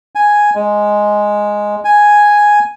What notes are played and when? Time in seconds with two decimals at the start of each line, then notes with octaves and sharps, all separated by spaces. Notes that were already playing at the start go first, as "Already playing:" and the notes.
0.15 G#5
0.55 G#3
1.85 G#5